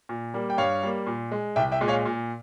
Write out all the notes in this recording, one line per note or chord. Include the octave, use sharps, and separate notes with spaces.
A#2
G3 A#3
G5
G2 C#5 F5
G3 A#3
A#2
G#3
C2 E5 G5
E5 G5
A#2 G#3
C#5 F5
A#2